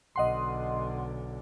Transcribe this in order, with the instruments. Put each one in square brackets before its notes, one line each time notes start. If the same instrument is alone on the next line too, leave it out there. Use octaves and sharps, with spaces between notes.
[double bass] B1 D3 [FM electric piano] D#5 F#5 C6